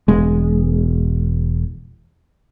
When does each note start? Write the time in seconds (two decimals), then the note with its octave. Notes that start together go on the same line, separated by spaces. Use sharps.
0.08 E1 G#3